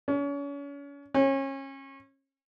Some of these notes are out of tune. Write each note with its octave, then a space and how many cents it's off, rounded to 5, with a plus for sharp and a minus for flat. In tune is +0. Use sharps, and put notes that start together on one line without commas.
C#4 +35
C#4 -30